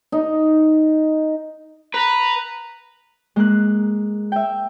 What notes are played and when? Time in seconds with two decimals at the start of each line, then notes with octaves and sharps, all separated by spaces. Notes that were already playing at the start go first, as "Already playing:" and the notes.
0.12 D#4
1.94 B4 A#5 B5
3.36 G#3 A#3 F#6
4.32 E5 G5